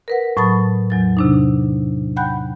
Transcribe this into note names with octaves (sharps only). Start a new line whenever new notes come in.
A#4 B4 F#5
A2 F#3 A5 B5 D#6 A6
E2 F#3 A6
C3 D4 D#4
F#5 G5 B5 F#6 G6